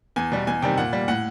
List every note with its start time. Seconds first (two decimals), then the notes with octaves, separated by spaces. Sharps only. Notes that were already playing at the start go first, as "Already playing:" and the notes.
0.16 E2 G#5
0.32 B2 G3
0.47 E2 G#5
0.62 C3 D#3 G3 G5
0.78 A#2 F#5
0.93 G3
1.08 A2 F#5